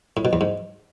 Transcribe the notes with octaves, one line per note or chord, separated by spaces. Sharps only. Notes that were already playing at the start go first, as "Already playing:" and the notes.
A2
B2
E2
G#2